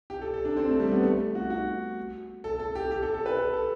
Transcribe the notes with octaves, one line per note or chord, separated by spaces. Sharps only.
G4
A4
A4
D4
C4
A3
G3
B3
A3
F#4
F#4
A4
A4
G4
G4
A4
A4
B4
A4
A4